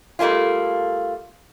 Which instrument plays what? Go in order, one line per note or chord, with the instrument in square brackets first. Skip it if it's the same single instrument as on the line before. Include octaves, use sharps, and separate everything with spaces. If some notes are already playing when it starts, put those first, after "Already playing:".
[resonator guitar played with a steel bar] G3 A3 A#3 C#4 F4